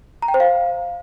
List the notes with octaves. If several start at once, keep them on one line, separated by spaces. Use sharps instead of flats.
A#5
G5
C5
F5